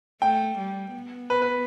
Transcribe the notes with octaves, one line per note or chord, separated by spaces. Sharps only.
A3 G5
G3
B3
B4
B4